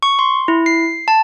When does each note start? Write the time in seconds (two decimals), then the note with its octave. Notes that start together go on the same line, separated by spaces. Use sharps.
0.03 C#6
0.19 C6
0.48 E4
0.66 C7
1.08 A5